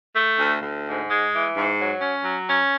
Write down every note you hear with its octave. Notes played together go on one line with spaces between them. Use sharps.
A3
D2
D2
G#2
G#3
E3
G#2
F#3
C#4
F#3
C#4